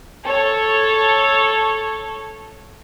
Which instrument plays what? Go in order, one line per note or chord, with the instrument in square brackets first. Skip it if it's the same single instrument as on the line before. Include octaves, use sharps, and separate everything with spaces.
[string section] A4 C#5